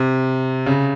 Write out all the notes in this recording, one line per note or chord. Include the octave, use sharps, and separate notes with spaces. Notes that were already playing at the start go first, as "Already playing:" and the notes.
Already playing: C3
C#3